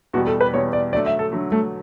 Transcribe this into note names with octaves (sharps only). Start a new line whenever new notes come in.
E2 B2 G3 F#4
A4
B4
E2 B2 G3 C#5
D5
D3 F#3 A3 D5
E5
A4
D3 F#3 A3
A3